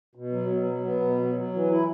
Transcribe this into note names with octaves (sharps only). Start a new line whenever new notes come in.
B2
F#3
B2
F#3
B3
B2
F#3
F#3
E3
E4